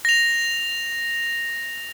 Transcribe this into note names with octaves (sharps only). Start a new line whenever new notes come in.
A#6 F7